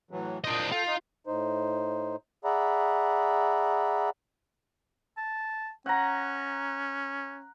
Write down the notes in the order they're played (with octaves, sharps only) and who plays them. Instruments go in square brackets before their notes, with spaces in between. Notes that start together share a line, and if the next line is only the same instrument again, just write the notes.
[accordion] A2 E3 F#3
[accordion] A#2 C5 D#6 [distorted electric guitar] D4 D#5
[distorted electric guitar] F4 [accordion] A4 G5
[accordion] D#4
A2 D#4 C5
G#4 D5 E5 F#5 A#5 B5
[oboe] A5
[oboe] C#4 [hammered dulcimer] F#5 A#5